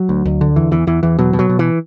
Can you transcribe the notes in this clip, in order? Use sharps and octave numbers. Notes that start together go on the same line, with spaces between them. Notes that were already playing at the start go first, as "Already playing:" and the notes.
Already playing: F#3
D2
D2
D3
E2 E3
E2 E3
E2 E3
E2 E3
B2 F#3
B2
F#3
B2
E3